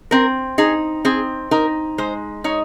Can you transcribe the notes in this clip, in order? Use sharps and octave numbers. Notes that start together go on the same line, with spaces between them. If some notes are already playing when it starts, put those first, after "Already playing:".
C4 A#4
D#4 G#4
C4 G#4
D#4 A#4
G#3 C5
D#4 C#5